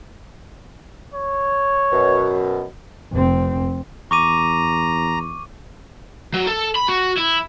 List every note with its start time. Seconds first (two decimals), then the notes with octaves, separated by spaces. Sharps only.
1.14 C#5
1.92 F#2 B2
3.12 F1 C4
4.11 E2 A#5 C#6 D6 D#7
6.34 F#3
6.47 A4
6.76 B5
6.88 F#4
7.17 E4